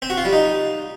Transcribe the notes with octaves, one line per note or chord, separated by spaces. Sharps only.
C4
F#4
F4
G3
D#4